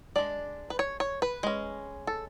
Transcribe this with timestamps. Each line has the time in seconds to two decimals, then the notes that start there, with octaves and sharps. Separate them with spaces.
0.16 G#3 D4 D5
0.70 B4
0.79 C#5
1.00 C#5
1.22 B4
1.43 G#3 C#4
2.07 A4